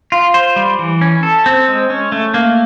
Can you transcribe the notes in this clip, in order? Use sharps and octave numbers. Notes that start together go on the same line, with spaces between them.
F4
C5
G3
E3
C#4
A4
C4
G#3
C#4
A3
A#3